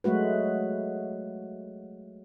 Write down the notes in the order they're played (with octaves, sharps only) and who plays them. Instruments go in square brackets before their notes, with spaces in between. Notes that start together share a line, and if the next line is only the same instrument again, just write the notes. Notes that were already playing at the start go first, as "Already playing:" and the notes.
[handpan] F#3 G#3 A3 F#4 B4